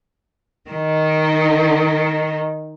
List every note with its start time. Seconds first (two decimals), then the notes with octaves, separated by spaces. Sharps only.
0.70 D#3 D#4